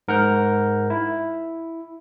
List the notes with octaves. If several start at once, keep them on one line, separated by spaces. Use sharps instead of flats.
G#2 A#4 F#5 F6 G6
E4